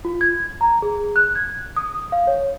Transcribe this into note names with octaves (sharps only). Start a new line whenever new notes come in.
F4
G#6
A#5
G#4
F#6
G#6
D#6
F5
C#5